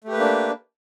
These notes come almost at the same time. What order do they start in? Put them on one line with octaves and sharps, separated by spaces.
A3 G4 B4 A#3 D4